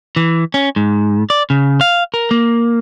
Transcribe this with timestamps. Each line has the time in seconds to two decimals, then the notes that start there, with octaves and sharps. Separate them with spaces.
0.16 E3
0.54 C#4
0.76 G#2
1.30 D5
1.50 C#3
1.81 F5
2.14 A#4
2.31 A#3